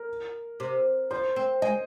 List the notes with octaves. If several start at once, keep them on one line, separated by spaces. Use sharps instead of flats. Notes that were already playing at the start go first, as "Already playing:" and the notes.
Already playing: A#4
C3
F3 C5
C4
G#3 D#5